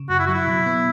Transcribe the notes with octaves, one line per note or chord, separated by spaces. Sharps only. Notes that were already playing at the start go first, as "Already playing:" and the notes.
Already playing: C#3
F#2 F#4
E4
F#3 F#4
E4
B2
B3